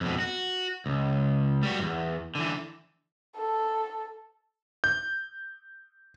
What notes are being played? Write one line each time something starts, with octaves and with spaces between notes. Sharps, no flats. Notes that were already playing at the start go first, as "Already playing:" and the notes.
F2 B2
F#4
C#2
G3 F#4
E2 G2
D3 E3
A4
G6